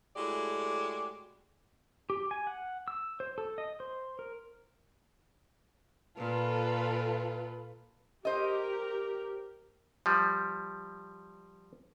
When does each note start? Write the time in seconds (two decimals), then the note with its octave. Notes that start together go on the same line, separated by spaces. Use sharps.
0.16 A2 G#3 E4 F#4 G4 D5
2.10 G4
2.31 G#5
2.47 F#5
2.88 E6
3.20 C5
3.38 A4
3.58 D#5
3.80 C5
4.19 A#4
6.17 A#2 F4 A4 B4
8.25 G4 A#4 C5 D#5
10.06 F3 G3